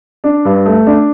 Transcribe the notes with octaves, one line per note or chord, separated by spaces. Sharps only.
D4
G2
A3
D4